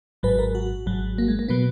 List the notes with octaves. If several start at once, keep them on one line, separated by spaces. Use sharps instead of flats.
G#1 G#2 F#3 B4
A#4
F#4
G#1 G#2 F#3
A#3
G#3
A#3
B2 F#3 B3